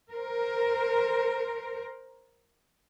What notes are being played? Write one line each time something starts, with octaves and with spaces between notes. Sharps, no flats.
A#4 C5